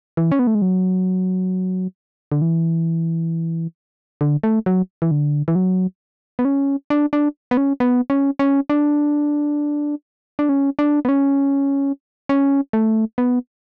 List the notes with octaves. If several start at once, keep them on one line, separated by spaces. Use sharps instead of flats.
E3
C#4
B3
A3
G#3
F#3
D3
E3
D3
A3
F#3
E3
D3
E3
F#3
B3
C#4
D4
D4
B3
C#4
B3
C#4
C#4
D4
D4
C#4
D4
B3
C#4
C#4
A3
B3